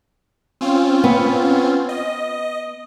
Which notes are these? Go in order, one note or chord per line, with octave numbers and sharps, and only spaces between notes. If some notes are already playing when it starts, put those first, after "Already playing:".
C4 C#4 F4
B3
D#5